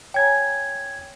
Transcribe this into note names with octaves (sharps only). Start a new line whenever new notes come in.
C#5 G5 G#5 A#5 G#6